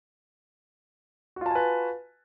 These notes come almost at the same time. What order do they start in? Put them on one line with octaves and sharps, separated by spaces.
F#4 F4 A5 G#5 B4